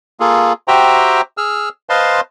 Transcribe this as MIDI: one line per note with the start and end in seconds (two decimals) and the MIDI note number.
0.20 0.53 58
0.20 0.53 65
0.20 0.53 68
0.20 0.53 69
0.68 1.21 66
0.68 1.21 67
0.68 1.21 72
0.68 1.21 76
0.68 1.21 79
0.68 1.21 82
1.38 1.69 68
1.38 1.69 88
1.38 1.69 89
1.90 2.21 71
1.90 2.21 72
1.90 2.21 75
1.90 2.21 77
1.90 2.21 81
1.90 2.21 84